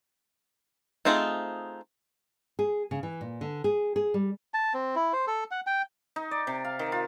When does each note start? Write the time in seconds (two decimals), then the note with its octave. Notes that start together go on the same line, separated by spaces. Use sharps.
1.05 A3 C4 D#4 F4 G#4
2.59 G#4
2.91 C#3
3.03 E3
3.21 A#2
3.41 D3
3.64 G#4
3.96 G#4
4.14 G3
4.54 A5
4.74 C4
4.96 E4
5.13 C5
5.27 A4
5.51 F#5
5.67 G5
6.16 D#4
6.31 D5
6.47 C3
6.65 F5
6.79 D#3
6.92 F4